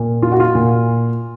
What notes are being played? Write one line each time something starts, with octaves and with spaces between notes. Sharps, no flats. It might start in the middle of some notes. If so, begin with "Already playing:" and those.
Already playing: A#2
F4
F#4
F4
A#2